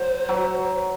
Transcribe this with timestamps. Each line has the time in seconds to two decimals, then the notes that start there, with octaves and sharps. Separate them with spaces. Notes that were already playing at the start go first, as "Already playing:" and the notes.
Already playing: F#3 C5
0.29 F#3